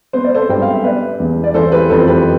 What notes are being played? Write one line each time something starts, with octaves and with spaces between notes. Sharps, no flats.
B3 C5
D5
A4 C5
G2 G5
F5
E5
B3 B4 D5
E2
D5
E3 A4 C5
G4 B4
F2 A4 C5
G4 B4